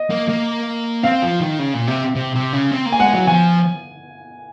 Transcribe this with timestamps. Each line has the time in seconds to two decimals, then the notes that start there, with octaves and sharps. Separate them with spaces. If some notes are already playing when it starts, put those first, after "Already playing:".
Already playing: D#5
0.10 A#3
0.29 A#3
1.03 C4 F5
1.22 F3
1.41 D#3
1.59 C#3
1.74 A#2
1.88 C3
2.15 C3
2.35 C3
2.53 C#3
2.71 C4
2.86 A#3
2.92 G#5
2.99 G#3 F#5
3.13 F#3
3.27 F3 G#5